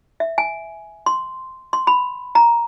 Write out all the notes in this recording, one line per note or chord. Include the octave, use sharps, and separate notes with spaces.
E5
G#5
C6
C6
B5
A#5